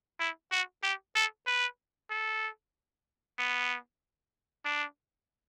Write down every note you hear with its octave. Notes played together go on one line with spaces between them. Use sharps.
E4
F#4
G4
A4
B4
A4
B3
D4